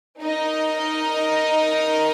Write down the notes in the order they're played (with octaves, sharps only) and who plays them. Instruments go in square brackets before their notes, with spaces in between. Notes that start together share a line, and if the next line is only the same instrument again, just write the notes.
[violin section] D#4 A#4 D#5